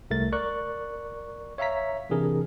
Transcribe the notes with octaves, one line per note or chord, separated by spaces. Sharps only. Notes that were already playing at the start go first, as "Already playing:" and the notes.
C2 A3 A#4 A6
A#4 D5 C#6 F#6
C#5 E5 F5 A#5 B6
C3 E3 D4 G#4 A#4